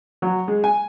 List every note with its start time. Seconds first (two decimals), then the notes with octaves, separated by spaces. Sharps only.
0.22 F#3
0.48 G#3
0.64 G#5